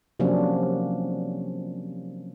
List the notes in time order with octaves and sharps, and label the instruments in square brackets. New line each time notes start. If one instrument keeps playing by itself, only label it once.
[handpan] C3 F3 F#3 A#3 C#4 D4